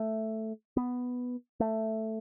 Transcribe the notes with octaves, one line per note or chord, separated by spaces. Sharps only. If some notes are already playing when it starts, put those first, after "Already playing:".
Already playing: A3
B3
A3